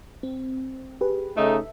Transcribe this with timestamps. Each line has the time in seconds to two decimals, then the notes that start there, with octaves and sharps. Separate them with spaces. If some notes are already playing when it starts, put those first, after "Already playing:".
0.23 C4
1.01 G4 G#4 B4
1.37 C#3 A3 D#4 A4 E5